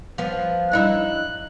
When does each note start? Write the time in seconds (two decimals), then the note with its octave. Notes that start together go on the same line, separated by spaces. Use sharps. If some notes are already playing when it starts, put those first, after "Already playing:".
0.18 F3 B3
0.72 G2 D#4 E4 F#6